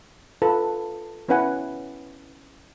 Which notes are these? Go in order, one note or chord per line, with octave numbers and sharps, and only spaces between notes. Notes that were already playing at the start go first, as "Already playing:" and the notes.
F4 A4 B4
B3 C#4 E4 B4 F#5 G#5